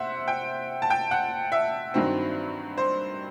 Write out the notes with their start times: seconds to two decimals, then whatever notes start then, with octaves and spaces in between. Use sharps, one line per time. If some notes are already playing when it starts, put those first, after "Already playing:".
Already playing: C3 C5 E5 F#5
0.28 G5
0.82 A5
0.90 G5
1.11 F#5
1.52 E5
1.94 G2 D#3 F#3 C4
2.78 C5